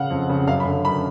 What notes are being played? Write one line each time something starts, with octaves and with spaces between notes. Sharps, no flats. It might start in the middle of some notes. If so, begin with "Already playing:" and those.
Already playing: C#3 F5 F#5
F2
C#3
F#2 F5
B5
D3
F#2 B5